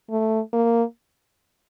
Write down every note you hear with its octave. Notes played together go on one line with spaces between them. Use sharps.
A3
A#3